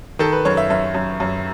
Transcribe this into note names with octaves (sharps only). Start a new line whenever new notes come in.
D#3 A4
B4
F#2 C#5
E5
F#2 E5
F#2
F#2